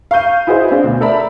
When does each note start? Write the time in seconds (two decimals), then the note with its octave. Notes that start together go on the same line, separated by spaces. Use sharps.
0.11 F5 C#6 G6 D#7
0.47 E4 F#4 G#4 B4 C5 D#5
0.71 C4 D4 F5
0.84 D2 B2
1.01 A4 A#4 D5 E5 A#5 B5